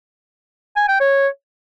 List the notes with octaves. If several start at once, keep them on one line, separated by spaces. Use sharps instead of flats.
G#5
G5
C#5